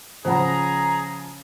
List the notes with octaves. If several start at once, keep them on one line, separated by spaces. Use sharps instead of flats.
C#3 F3 C#4 G#4 C5 F#5 A#5 B5